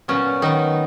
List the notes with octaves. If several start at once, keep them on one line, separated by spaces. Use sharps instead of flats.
A#2 F#3 B3 C#4
D#3 F#3 B3 D#4